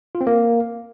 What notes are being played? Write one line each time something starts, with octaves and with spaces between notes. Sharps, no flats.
F4
C4
A#3